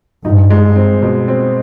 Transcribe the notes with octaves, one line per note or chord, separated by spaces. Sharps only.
G2 D#4
G#3
C4
B2
C4